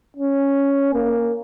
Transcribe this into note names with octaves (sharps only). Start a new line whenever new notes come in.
C#4
A#3